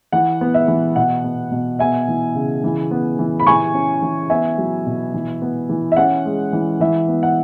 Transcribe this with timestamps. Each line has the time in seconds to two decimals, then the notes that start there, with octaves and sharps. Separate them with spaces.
0.12 E3 F#5
0.41 B3
0.54 E5
0.68 E3
0.96 B2 F#5
1.24 B3
1.52 B2
1.79 B3 E5 G#5
2.08 E3
2.35 C#3
2.64 E3
2.91 B3
3.19 E3
3.40 B5
3.46 E3 G#5 C#6
3.74 C#4
4.02 E3
4.30 B3 E5 G#5
4.58 F#3
4.86 B2
5.14 E3
5.42 B3
5.69 E3
5.92 E5
5.97 C#4 F#5
6.25 G#3
6.53 E3
6.80 E3 E5
7.08 B3
7.23 F#5